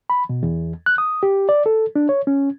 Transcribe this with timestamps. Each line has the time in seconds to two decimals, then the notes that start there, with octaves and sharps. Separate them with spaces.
0.10 B5
0.29 B2
0.43 E2
0.86 F#6
0.98 D#6
1.23 G4
1.49 D5
1.66 A4
1.96 D4
2.09 C#5
2.27 C#4